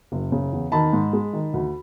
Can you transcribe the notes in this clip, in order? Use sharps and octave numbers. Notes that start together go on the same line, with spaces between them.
F#1
C#3
E2
D#3 A5 B5
G#2
G#3
D#3
D2